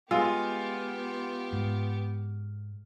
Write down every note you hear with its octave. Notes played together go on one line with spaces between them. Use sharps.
G#3 B3 F4 G4
G#2